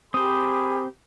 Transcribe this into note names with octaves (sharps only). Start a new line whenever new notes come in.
C4 G4 G#4 A#4 C5 B5 D#6